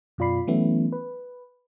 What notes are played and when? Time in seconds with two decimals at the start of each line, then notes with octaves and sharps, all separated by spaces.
0.18 F#2 B2 F4 D5 B5 C7
0.47 E3 F#3 A3 B3 C#4 E4
0.93 B4